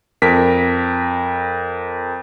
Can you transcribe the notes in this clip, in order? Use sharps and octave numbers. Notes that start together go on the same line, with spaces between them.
F2 A#4 B6